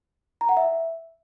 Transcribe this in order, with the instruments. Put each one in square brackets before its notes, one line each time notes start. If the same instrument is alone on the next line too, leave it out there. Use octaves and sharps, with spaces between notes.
[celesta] A#5
F#5
E5